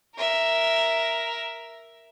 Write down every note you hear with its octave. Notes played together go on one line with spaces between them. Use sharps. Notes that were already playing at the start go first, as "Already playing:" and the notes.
A#4 E5